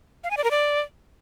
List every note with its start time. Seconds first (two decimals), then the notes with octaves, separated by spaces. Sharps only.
0.24 F5
0.31 G#5
0.37 D5
0.44 A#4
0.51 D5